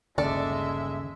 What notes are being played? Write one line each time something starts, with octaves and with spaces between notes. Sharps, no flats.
G1 D#2 C#3 G#3 A4 D5 E5